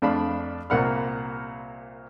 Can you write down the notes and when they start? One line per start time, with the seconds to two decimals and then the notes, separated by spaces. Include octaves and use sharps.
0.02 F2 A3 D4 F5 B5
0.70 C2 A#2 A#3 F#5 B5 F6